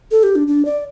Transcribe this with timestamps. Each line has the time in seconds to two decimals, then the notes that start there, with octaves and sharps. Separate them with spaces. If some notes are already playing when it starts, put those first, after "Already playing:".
0.11 A4
0.23 G4
0.35 D4
0.47 D4
0.65 D5